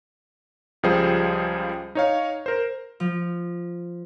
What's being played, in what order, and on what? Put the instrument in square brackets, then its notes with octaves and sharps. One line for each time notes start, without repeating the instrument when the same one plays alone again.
[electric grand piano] C#2 F3 G3 G#4 C5
D#4 C#5 F5
A#4 C5
[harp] F3